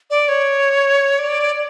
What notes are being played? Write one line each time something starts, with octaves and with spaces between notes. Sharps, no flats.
D5
C#5
D5